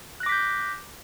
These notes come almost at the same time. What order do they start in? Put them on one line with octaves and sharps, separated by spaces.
F#6 A#6 D6 B6 G6